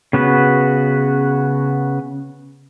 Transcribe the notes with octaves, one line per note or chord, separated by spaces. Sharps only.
C#3 B3 F#4 B4